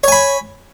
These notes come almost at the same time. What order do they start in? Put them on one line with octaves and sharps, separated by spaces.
C#5 G#5 B5